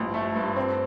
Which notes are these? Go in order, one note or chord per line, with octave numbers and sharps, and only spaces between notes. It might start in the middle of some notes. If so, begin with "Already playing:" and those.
Already playing: A1 G2 F3
A3
G2
C4